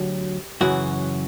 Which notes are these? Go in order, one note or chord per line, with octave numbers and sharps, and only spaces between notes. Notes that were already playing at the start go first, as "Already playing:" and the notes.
Already playing: D2 D3 F#3 G4
F#2 C#3 E3 F#4